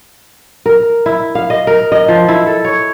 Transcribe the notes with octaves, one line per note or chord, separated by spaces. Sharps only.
A#4
E4
F5
D#5
A#4
D#5
F3
E4
A4
C#5